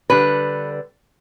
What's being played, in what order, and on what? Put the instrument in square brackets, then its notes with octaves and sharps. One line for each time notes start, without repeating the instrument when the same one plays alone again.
[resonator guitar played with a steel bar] D3 G3 B4